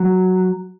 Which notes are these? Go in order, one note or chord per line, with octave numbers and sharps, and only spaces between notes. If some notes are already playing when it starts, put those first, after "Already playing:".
Already playing: F#3